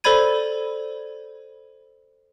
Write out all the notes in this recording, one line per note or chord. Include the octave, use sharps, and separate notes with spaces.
A4 C5 D5 B5 G#6 D#7